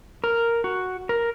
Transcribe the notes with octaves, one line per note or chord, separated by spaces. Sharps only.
A#4
F#4
A#4